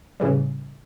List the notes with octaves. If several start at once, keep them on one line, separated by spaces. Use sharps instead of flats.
A2 C#3 E3 G3